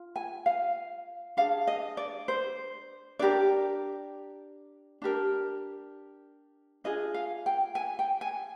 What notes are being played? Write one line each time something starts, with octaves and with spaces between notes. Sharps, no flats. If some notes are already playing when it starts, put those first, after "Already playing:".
Already playing: F4
G#5
F5
D4 G#4 F5
D#5
D5
C5
D4 G4 A#4 D5
D4 G4 A#4
D4 F4 G#4 D#5
F5
G5
G#5
G5
G#5